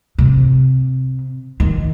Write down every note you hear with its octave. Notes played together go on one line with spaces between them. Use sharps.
C3
D#3